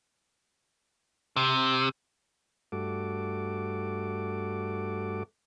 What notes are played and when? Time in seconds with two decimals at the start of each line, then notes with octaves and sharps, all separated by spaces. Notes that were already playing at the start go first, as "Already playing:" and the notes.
1.36 C3
2.72 G2 A3 F#4 A4 D6